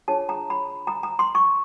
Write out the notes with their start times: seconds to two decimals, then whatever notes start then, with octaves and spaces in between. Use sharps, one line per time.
0.08 D4 F4 G#4 C#5 A5
0.29 A#5
0.50 B5
0.87 A#5
1.03 A#5
1.19 C6
1.35 C#6